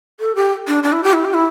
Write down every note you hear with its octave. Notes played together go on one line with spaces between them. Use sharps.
A4
G4
D4
D4
E4
G4
E4
G4
E4